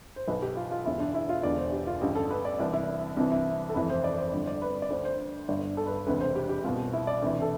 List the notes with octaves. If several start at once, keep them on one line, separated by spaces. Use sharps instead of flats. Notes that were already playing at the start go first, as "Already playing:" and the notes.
C5
B1 B2 B4
G4
F4
F4
E1 E2 D3 E4
D4
E4
F4
E1 E2 D3 D5
C5
G4
F4
A1 G2 D3 G4
A4
B4
D5
C2 C3 E3 D5
E4
C2 C3 E3 D4
E4
A4
F1 F2 C3 E3 B4
C5
D5
C5
G1 F2 D3 D5
D5
B4
D5
D2 D3 C5
C5
G1 G2 D3
A4
B4
A4
E1 D2 C3 B4
C5
G4
G4
C2 B2 F4
E4
D5
D2 C3 E3
A4